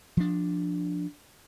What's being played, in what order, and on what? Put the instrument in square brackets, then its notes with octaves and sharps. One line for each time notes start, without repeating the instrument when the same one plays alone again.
[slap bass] F3 D4